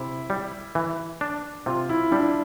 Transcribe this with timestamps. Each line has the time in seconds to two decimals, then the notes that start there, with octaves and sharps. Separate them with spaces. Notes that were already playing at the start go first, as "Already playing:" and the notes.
Already playing: C3 E4
0.30 G3
0.75 E3
1.21 D4
1.66 C3 F4
1.89 E4
2.11 G3 D4